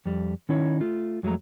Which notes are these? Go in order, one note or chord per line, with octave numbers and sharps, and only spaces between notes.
F2 G3
D#3 C#4 D#4 E4 C#5
A3 F4
F2 F#3 G#3 A3 A#5